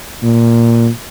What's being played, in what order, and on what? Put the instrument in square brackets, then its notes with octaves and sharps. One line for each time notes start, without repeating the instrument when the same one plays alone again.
[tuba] A#2